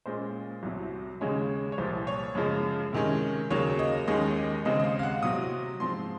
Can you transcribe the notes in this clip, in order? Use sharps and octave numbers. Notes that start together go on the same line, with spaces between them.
A#2 G#3 C#4 C5
C2 C3 F#3
D#2 C#3 G#3 C#4 C#5
C#5
C2 A#2 F3 C5
C#5
F#2 C#3 F3 G#3
C3 D#3 G#3 C#4
D#2 C#3 F#3 A#3 C#5
D#5
D#2 D#3 G#3 C#4 D#5
D#5
D#2 C#3 G#3 C4 D#5
D#5
F5
F5
F#5
C3 F#3 C4 D#6
G#2 F3 C4 C6